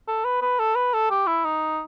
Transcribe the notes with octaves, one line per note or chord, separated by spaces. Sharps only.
A4
B4
B4
A4
B4
A4
G4
E4
D#4